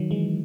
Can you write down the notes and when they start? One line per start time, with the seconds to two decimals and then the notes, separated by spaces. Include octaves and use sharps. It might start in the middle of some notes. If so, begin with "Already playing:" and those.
Already playing: D#3 F#3
0.11 E3 G#3